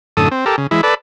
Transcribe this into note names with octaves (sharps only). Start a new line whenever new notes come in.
F#2 A2 D3 A4 D#6
C4
G4 A4 A#4
C#3
E3 G#3 E4
A4 B4 D5